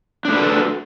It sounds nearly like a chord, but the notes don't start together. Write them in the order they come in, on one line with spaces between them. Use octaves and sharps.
D4 A3 B4 F#4 A4